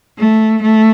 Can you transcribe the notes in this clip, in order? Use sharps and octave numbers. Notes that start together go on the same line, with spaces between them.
A3
A3